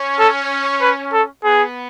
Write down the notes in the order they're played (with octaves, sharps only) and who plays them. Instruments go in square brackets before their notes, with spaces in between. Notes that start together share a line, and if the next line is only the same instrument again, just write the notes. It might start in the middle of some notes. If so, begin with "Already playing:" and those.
Already playing: [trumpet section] C#4
[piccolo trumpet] A4
B4
A4
[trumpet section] B3 [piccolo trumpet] G#4